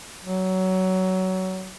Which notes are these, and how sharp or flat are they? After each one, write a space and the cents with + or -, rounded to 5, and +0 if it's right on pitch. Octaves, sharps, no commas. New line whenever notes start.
F#3 +20